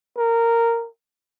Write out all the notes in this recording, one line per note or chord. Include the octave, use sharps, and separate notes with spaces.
A#4